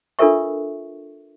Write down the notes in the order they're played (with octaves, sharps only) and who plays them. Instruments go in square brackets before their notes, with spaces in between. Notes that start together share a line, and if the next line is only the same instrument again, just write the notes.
[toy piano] D4 F4 A4 A#4 E5 C#6